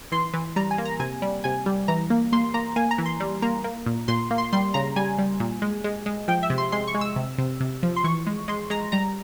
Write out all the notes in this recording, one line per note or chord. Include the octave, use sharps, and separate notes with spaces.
E3 C6
E3
G3 A#5
G#5
A#3
A#5
C3 G#5
G3
C3 G#5
G3
E3 A#5
A#3
A#3 C6
A#3 A#5
A#3 G#5
A#5
E3
C6
G3
A#3 A#5
A#3
A#2
A#2 C6
A#3
C6
G3 C6
C#3 A#5
G3 G#5
G3
A#2
G#3
G#3
G#3
F3 G5
E5
C3
C6
G#3 C6
C#6
G#3
E6
C3
C3
C3
F3
C6
E3 C#6
G#3
G#3 C6
G#3 A#5
G3 A#5